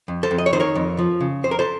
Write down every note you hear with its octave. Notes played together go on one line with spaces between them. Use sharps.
F2
A4 C5
F2
D#5
C#5
D#3 C5
A#4 C#5
F2
F3
C#3
F2 C5
A#4
A4 C5